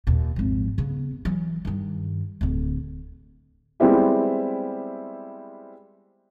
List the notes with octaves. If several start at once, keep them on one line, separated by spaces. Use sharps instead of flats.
D#2 A#2
G#1 F3
C#3 B3
E3 F#3
G2 D#3
D1 D3
G3 G#3 B3 C4 E4 G4